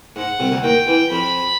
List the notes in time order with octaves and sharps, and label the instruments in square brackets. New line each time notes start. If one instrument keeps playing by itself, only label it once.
[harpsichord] G#2 [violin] F#5
[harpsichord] C2 C3
D2 D3
[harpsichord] D#2 D#3 [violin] G5
[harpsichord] E2 E3
[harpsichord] F2 F3 [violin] B5